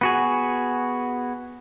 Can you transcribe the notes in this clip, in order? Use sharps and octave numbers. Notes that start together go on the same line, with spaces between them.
B3 F#4 G#4